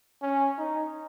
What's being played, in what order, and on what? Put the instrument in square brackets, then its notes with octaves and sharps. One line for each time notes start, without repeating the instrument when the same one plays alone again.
[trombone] C#4
D#4